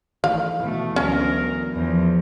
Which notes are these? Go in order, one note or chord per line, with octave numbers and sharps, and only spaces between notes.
D#3 E3 A3 F5
B2 E3 A3
D2 E3 F#3 B3 C#4 A#4
E2 F3